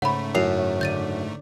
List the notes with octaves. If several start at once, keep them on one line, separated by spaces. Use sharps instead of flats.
G#2 C#3 A3 C#5 F#5 B5
F#2 E4 C7 F7
C#5
D3 D5 G6 A6 D#7